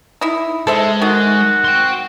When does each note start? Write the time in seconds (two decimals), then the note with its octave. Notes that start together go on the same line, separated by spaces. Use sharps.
0.21 D#4 E4
0.67 G#3 A4 C5 E5
1.02 D#3 F#4
1.64 G5 C6